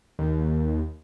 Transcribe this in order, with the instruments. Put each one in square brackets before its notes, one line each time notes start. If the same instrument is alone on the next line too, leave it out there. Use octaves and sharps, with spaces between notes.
[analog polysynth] D#2